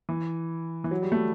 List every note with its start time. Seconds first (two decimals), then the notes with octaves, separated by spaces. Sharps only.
0.09 E3
0.84 E3
0.91 F#3
1.02 G3
1.12 A3